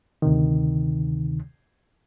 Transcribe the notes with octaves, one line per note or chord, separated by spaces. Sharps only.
D2 C3 D#3